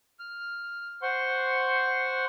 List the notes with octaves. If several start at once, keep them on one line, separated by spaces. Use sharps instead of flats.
F6
C5 F#5 C6 C#6